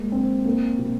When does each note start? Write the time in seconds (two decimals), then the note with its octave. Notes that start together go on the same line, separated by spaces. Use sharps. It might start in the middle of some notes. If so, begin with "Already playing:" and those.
Already playing: G#3 A#3
0.12 C4
0.45 A#3
0.79 B2